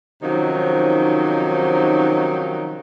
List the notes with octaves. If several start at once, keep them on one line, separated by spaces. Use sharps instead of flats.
C3 D#3 F3 F#3 C#4 D#4